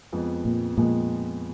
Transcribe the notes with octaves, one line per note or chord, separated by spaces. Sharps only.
F2 F3 G#3 B3
A#2
F2 A#2 F3 G#3 B3